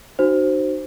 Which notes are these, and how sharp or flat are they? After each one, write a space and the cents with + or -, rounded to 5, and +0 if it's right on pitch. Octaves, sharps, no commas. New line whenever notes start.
D#4 -40 F#4 +20 C5 +0